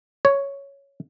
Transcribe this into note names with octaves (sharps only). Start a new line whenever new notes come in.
C#5